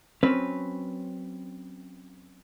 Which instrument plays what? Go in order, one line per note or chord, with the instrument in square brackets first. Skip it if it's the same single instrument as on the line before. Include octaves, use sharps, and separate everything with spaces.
[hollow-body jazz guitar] F#3 C4 C#4 B4